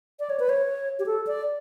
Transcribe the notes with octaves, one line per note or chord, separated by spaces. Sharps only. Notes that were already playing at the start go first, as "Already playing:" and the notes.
D5
C#5
B4
C#5
G4
A4
D5